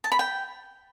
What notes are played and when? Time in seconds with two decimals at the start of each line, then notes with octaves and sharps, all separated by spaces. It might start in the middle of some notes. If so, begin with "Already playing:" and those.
0.04 A5
0.12 B5
0.19 G5